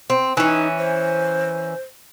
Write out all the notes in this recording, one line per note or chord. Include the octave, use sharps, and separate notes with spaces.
C4
E3 C#4 D#4
C5